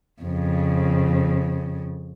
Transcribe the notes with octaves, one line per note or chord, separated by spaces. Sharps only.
F2 C#3